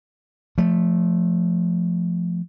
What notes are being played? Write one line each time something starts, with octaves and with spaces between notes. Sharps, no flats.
F3 A3